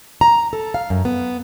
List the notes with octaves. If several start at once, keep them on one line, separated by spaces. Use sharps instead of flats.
A#5
A4
F5
F#2
B3